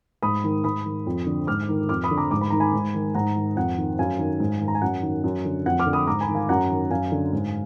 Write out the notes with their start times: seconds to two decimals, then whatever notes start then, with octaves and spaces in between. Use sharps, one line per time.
0.23 G#2 B5 D#6
0.44 D#3
0.64 G#2 B5 D#6
0.85 D#3
1.06 F2
1.27 D3
1.47 G#2 D6 F6
1.69 D#3
1.89 F2 D6 F6
2.04 B5 D#6
2.11 D3
2.17 A#5 D6
2.31 G#2 D6
2.41 B5
2.50 D#3 A#5
2.60 G#5 B5
2.73 G#2
2.94 D#3
3.15 G#2 F#5 A#5
3.36 D#3
3.56 F2 F#5
3.78 D#3
3.99 F#2 F5 G#5
4.19 D#3
4.40 G#2
4.61 D#3
4.68 A#5
4.75 G#5
4.82 F#2 F#5
5.02 D#3
5.24 F#2
5.45 D3
5.66 F2 F#5
5.79 D6 F6
5.87 D3
5.93 B5 D#6
6.07 G#2 A#5 D6
6.21 G#5 B5
6.28 D#3
6.35 F5 G#5
6.49 F#2 F#5 A#5
6.71 D#3
6.91 F#2 F5 G#5
7.12 D3
7.33 G#2